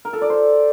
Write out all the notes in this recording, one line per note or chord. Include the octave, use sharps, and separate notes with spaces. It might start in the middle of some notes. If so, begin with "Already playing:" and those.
A#4
A4
D5
C5